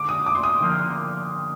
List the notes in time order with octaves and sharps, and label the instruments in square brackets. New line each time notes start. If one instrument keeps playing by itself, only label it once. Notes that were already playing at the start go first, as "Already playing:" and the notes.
Already playing: [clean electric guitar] D3 G#3 [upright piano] D6
[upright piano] D#6
D6
C6
D#6
[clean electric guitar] D3 F3 A#3